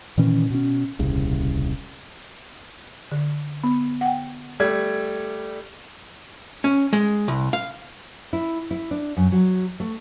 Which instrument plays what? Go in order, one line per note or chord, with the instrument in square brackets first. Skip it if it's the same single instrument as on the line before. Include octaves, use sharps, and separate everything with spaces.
[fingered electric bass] A#2 D#3 E3 C#4
B2 C#4
D#1 C2 C#3
[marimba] D3
B3
F#5 G5
[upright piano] G3 A3 G#6
[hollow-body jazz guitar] C#4
G#3
C2
F5
[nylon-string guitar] E4
E4
D4
F#2
F#3
A3